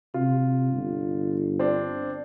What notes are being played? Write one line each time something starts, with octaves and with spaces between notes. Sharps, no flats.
C3 F4
G1
C4 D4